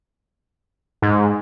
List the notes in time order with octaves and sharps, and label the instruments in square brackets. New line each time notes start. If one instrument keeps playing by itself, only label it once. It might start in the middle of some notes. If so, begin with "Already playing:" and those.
[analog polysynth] G#2